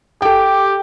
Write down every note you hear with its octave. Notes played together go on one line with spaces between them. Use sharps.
G4 A4 G5